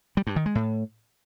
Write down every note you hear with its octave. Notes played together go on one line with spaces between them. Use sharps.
G3
G2
D#3
G#3
A2